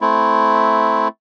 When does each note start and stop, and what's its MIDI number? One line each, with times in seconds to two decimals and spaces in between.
0.01 1.08 57
0.01 1.08 60
0.01 1.08 64